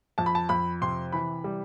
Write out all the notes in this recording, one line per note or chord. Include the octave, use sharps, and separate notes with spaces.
F2 A5
B5
A5
F2 B5
C3 C6
E3 B5
G3